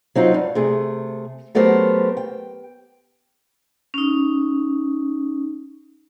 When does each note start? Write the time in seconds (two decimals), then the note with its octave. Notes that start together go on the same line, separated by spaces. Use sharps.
0.15 F#3 C4 D#4 F4
0.34 G2
0.55 C3 A3 G#4
1.55 F#3 A3 B3 G4 A#4 C5
2.17 G5
3.94 C#4 D#4